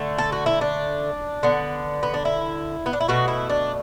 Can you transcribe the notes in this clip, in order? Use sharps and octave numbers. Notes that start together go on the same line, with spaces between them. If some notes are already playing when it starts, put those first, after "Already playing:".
Already playing: D3 A3
A4
F#4
E4
D4
D3 B3
B3
D4
E4
B3
D4
E4
B2 A3 F#4
E4
D4